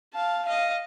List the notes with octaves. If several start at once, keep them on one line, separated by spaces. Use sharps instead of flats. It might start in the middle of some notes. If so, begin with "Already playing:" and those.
F5 A5
D#5 F5